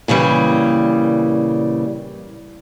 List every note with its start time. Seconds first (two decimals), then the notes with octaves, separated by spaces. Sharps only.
0.08 A#2 C#3 E3 G3